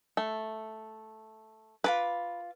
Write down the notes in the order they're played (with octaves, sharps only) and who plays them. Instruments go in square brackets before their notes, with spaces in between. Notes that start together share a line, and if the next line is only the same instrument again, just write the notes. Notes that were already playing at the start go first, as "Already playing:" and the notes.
[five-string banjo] A3
[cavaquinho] F4 A4 D6 [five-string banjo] B4